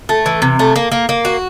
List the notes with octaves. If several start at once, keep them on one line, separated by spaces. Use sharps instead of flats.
A3
E3
C3
A3
A#3
A#3
A#3
F#4